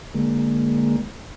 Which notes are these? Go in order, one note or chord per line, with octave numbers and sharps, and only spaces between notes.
D3 G#3 A#3